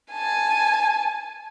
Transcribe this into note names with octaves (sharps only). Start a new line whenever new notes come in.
G#5 A5